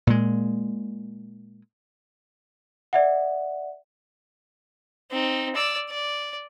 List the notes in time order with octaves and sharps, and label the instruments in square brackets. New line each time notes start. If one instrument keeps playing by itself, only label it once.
[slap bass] A#2 G#3
[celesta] D5 E5 F#5
[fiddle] C4 D#4
D5 E6
D5